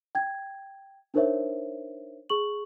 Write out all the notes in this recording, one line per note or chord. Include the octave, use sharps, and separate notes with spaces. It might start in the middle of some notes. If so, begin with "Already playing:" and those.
G5 G#6
D4 D#4 A#4 C5 C#5 E5
G#4 C#6 F#7